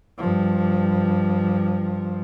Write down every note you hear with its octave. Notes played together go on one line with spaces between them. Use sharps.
G2 F3